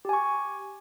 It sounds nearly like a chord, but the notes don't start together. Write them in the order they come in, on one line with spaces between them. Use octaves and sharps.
G4 G#5 C#6